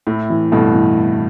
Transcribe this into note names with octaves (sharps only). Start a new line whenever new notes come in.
A2 E4
E3
G2 B2 A3
E3